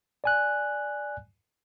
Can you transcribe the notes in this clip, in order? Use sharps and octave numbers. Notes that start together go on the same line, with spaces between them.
D5 G#5 F#6